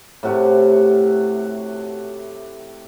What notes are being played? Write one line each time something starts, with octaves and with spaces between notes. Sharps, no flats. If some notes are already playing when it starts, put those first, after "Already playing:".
A2 C3 F#4 G4